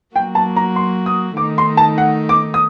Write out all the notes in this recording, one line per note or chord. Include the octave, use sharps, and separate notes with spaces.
F#3 A#3 F#4 G5
A5
A#5
C6
D#6
D#3 A3 D#4 D6
C6
A5
F#5
D6
D#6